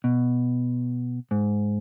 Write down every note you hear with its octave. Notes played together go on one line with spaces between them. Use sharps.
B2
G#2